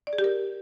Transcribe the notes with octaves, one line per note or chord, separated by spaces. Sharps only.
D5
G#4
G4
A#4